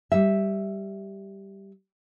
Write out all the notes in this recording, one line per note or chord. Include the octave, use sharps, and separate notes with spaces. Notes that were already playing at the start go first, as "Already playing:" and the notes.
G3 E5